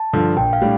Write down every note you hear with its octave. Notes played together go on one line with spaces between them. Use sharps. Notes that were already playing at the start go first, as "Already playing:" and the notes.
Already playing: A5
G2 D3 F3
A#1 G5
F5
A2 G3 D4